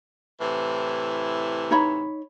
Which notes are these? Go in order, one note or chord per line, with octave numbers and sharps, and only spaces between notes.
A2 C3 E3
D#4 C#5 B5